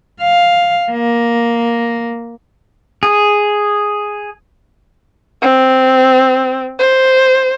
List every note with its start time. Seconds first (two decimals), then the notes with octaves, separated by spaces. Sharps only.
0.21 F5
0.92 A#3
3.03 G#4
5.42 C4
6.79 C5